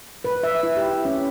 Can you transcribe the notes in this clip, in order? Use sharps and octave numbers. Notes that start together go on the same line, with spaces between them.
B4
E5
E4
G4
C#4